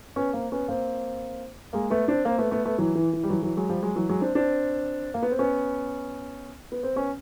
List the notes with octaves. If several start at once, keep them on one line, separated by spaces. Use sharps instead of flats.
B3 C#4
A#3 C4
B3 C#4
A#3 C4
G#3 A#3
A3 B3
C4 D4
A#3 C4
A3 B3
A3 B3
A3 B3
E3 F#3
E3
E3
G3
E3 F#3
E3 F#3
F#3 G#3
F3 G3
F#3 G#3
E3 F#3
F#3 G#3
C4 D4
C4 D4
A#3
B3
C4
B3 C#4
B3
C4
B3 C#4